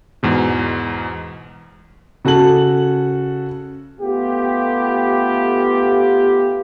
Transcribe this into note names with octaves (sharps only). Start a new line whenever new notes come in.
E2 G#2 B2
C#3 F#4 A4 A5 F#7
A3 B3 F4 G4